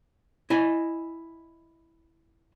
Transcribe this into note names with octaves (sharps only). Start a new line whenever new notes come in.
E4 D#5 G#5